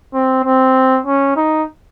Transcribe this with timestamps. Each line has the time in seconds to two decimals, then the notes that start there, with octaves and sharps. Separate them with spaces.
0.14 C4
0.45 C4
1.06 C#4
1.36 D#4